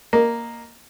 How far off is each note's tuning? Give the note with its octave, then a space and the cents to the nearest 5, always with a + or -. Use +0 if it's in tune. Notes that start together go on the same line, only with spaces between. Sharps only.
A#3 +0 D#5 -25